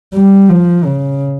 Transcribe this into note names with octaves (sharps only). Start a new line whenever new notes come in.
G3
F3
C#3